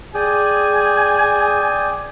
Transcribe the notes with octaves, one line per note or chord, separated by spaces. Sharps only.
G#4 D5 G5 G#5 D#6